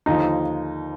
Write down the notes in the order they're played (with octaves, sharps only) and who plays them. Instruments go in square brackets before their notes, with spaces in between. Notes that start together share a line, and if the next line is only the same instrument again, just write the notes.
[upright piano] D#2 D3 F3 D#4